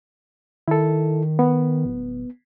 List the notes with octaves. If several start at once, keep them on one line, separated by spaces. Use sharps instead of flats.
D#3 E4 A4
B3
D1